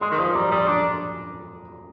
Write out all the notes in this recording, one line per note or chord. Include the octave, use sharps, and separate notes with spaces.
G#3 C6 D#6
D#3
F3 C6 D#6
G3 A#5 D6
G3 C6 D#6
D4 A#5 D6